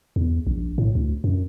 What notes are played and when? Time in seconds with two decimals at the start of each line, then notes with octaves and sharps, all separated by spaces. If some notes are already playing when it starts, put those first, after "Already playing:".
0.16 E2
0.47 A#1
0.78 A2
0.95 D2
1.24 F#2